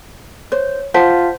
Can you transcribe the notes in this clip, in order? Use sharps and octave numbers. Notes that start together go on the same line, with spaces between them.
C5 C#5
F4 C5 F#5 A5 B6